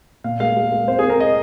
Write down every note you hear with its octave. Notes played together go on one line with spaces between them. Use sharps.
A#2 F5
G#3 F5
G#3
G#3
C4 C5
G#4
C4
A#4
D#5